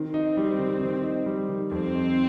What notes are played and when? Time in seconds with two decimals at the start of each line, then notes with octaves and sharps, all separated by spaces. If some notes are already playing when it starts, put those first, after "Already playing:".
Already playing: D#3 C4
0.14 D#4
0.37 G3
0.59 D#3
0.81 D#3
1.03 D#4
1.26 G3
1.49 D#3
1.71 F2 C4
1.94 D#4